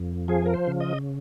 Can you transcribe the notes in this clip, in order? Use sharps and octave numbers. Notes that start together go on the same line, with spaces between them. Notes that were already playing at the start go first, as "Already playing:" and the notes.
Already playing: F2
F3 G#4
A#4
C5
C#3
D#5